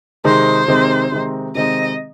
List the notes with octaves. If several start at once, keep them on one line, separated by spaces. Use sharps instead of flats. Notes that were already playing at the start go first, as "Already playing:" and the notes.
C3 D#3 G#3 C4 D#4 C5
C3 D#3 G#3 C4 D#4
C3 D#3 G#3 C4 D#4
C3 D#3 G#3 C4 D#4 D#5